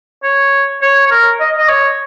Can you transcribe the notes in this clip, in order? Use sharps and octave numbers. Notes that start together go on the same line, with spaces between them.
C#5
C#5
C#5
A#4
D#5
D#5
C#5